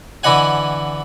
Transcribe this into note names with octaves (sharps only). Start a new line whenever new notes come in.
D3 E3 E4 D#5 F#5 G#5